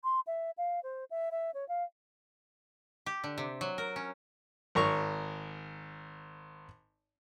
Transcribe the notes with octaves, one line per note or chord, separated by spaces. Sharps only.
C6
E5
F5
C5
E5
E5
C#5
F5
G4
D3
C3
F#3
A#4
C#4
G#1 A#4 A#5 C#6